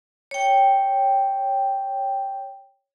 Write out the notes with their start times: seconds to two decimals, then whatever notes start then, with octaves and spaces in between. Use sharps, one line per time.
0.31 C#5 G5